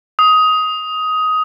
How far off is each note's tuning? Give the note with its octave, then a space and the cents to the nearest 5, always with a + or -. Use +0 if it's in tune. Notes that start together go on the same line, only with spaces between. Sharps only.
D#6 +15